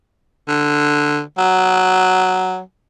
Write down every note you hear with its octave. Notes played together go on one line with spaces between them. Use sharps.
D3
F#3